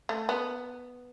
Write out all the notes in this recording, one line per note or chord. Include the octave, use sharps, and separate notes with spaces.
A3
B3